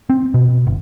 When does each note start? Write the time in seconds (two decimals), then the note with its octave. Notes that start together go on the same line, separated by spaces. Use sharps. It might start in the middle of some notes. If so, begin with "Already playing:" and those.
0.10 C4
0.34 B2
0.67 G1